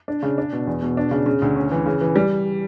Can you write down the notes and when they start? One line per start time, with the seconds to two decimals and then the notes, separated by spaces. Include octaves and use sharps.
0.08 D4
0.23 C#3
0.38 D4
0.52 B2
0.67 E2
0.82 B2
0.97 D4
1.11 C#3
1.26 C#3
1.42 D2
1.56 C#4
1.72 E3
1.86 C#3
2.01 E3
2.16 G3